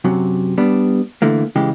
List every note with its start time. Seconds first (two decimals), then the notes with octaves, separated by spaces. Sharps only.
0.05 F#2 C3 F#3
0.58 G3 B3 D4
1.22 D3 E3 A3 A#3
1.56 C#3 E3 G#3 G4